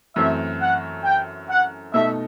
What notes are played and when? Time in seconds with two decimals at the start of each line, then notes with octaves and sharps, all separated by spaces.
0.15 F#2 E3 A3 C4 E5
0.61 F#5
1.04 G5
1.49 F#5
1.93 B2 A3 D#4 E5